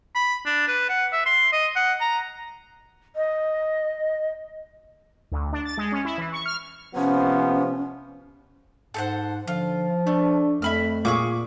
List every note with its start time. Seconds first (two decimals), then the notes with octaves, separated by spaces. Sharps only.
0.15 B5
0.46 D4
0.68 B4
0.89 F#5
1.12 E5
1.26 C6
1.52 D#5
1.76 F#5
2.01 A#5
3.15 D#5
5.32 D2
5.53 D4
5.65 A6
5.78 G#3
5.92 C#4
6.05 E4
6.18 E3
6.32 C#6
6.46 F6
6.95 C3 F3 B3 C#4
8.94 G#2 A4 C5 F#5
9.48 D3 F3 F4
10.07 A3 D4
10.62 F2 A3 E5 B5 F6
11.05 A#2 G#4 C#6 D6